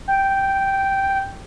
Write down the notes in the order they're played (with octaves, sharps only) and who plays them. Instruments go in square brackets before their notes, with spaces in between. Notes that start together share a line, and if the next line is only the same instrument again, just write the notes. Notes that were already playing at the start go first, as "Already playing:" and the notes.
[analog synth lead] G5